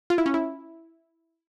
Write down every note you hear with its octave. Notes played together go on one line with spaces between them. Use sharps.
F4
E4
C#4
E4